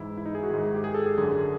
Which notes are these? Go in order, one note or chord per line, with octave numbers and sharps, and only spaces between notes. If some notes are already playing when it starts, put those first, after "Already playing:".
Already playing: G#2 E3 E4
E4
D#4
G#4
F#4
G#2 D#3 G#4
G4
G#4
A4
G#4
F#2 D3 G#4